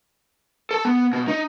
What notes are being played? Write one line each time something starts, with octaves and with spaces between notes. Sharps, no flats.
A4 A5
B3
B2
D#4